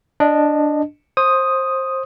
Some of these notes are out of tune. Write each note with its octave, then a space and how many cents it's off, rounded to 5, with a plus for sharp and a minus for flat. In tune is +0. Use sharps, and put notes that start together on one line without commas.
D4 +0 D#5 -15
C5 +20 D#6 +0